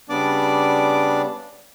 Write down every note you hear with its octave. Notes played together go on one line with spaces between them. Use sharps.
C#3 G3 B3 D4 D5 D6